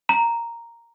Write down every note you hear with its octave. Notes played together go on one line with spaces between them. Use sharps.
A#5